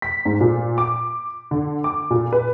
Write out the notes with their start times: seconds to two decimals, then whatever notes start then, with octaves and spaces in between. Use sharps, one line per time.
0.02 B6
0.25 G#2
0.41 A#2
0.78 D6
1.51 D3
1.84 D6
2.11 A#2
2.33 B4